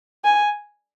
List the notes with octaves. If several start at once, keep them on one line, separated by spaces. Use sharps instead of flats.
G#5